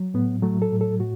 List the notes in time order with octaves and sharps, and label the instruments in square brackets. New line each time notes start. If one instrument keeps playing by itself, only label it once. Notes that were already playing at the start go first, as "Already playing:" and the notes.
Already playing: [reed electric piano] F#3
A2 B3
F#3 A3
A4
A2
A4
A2 F#4